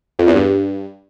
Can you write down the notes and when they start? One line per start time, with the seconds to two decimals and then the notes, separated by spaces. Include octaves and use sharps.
0.19 F2
0.27 E2
0.35 G2